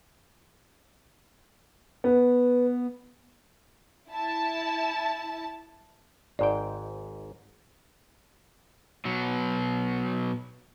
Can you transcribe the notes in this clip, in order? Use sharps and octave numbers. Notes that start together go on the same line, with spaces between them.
B3 B4
E4 A5
G#1 G#2 D5 G5
B2 F#3